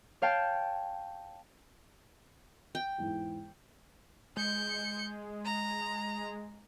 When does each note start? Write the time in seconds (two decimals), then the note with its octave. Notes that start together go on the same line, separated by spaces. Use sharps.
0.22 C#5 F5 G5 A5
2.75 G5
2.98 E2 G#2 E3
4.37 G#3 G6 C#7
5.45 A#5